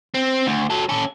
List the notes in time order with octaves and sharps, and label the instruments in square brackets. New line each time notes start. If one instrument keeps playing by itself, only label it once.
[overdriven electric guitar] C4
D2
F#3 A4
C#4 A4